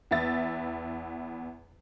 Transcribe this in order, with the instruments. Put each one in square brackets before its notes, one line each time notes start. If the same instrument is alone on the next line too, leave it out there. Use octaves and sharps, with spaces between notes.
[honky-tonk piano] E2 B3 E5 A6